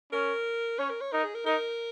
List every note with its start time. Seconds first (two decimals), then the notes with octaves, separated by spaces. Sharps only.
0.12 C#4 A#4
0.79 C#4 C#5
0.90 A#4
1.01 C#5
1.12 D#4 A#4
1.24 G#4
1.35 A#4
1.46 D#4 A#4